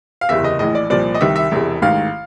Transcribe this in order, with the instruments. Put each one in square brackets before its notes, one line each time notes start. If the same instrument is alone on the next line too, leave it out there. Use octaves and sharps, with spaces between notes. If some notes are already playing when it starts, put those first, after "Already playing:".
[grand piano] F5
F#1 E2 C3 E5
D#5
A#1 A2 E3 D#5
D5
C2 A#2 F3 D5
D#5
C2 C3 D#3 E5
E5
E1 E2 C3
A1 G#2 D#3 F5